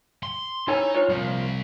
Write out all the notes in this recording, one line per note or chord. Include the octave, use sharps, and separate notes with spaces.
C6
D#4 E4 C#5 G#5
F4 C#5
A#2 F3 G3 C4